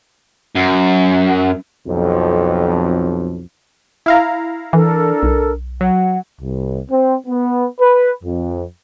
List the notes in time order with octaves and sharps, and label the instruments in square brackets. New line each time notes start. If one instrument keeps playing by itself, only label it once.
[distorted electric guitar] F#2
[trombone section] B1 F2
[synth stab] E4 F5 A#5
[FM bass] E3 [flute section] D4 A4 A#4
[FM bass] B1
[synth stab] F#3 [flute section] F#5
[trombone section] C2
C4
B3
B4
F2